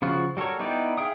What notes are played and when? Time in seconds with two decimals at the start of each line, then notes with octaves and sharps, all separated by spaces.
0.02 C#3 F3 F4 F#4
0.37 G3 F#4 A4 A#4 C#5
0.59 B3 D#4 E4 D5 G5
0.98 G#4 E5 F5 G5 D#6